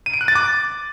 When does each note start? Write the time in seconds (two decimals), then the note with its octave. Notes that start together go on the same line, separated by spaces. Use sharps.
0.06 D#7
0.14 D7
0.21 F#6
0.28 A6
0.35 D6